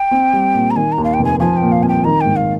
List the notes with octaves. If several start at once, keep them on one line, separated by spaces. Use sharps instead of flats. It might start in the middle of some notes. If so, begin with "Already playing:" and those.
Already playing: G5
C4
G3
A#2
A#5
D#3 G#5
A#5
D#2
F5
G5
F1
G#5
F3 G#5
G5
A#2
F5
C2 G#5
G5
D#3 A#5
G#2 G5
F5